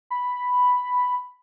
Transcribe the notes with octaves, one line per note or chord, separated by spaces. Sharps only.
B5